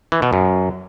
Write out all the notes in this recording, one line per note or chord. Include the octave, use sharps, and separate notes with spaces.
E3
B2
F#2